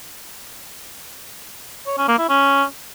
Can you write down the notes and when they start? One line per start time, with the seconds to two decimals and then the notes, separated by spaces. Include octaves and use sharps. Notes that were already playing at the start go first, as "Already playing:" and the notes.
1.87 C#5
1.97 C#4
2.08 A#3
2.18 E4
2.29 C#4